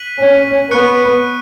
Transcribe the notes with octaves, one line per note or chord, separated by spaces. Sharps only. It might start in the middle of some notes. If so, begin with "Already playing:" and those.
Already playing: F#6 B6 D#7 F#7
C#4
B3 C#6 F#6 C#7